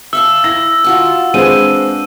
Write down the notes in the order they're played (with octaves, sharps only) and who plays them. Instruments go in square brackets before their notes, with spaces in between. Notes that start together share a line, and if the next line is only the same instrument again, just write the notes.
[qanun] E5 F5 A5 [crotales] E6
[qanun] E4 [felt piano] A#6
[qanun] F4 F#4 A5
[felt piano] G#3 C4 G#4 [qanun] D4 B4 [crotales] D#7